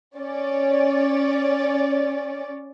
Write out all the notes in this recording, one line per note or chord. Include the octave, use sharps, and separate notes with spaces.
C#4 D5